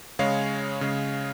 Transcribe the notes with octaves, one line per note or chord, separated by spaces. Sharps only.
C#3 G#3 C#5 F5
C#3 G#3